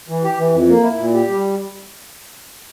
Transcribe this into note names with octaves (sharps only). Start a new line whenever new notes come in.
E3
G4
E3
F2
A#3
E4
A#2
G4
G3